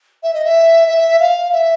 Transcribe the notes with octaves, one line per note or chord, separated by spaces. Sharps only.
E5
D#5
E5
E5
F5
E5